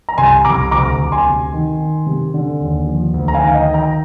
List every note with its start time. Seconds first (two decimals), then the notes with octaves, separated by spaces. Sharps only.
0.09 A#5
0.18 C2 G#5 C6
0.45 C2 A#5 D6
0.71 D2 A#5 D6
0.99 D2
1.12 G#5 C6
1.25 C3
1.53 D#3
1.80 D#3
2.06 C3
2.34 D3
2.60 D#2
2.87 F3
3.14 D2
3.28 A#5
3.34 F5 G#5
3.41 D#3
3.54 D#5 G5
3.68 D#3
3.74 G5 A#5